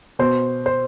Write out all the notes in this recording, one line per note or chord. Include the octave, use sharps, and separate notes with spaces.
B2 C5
C5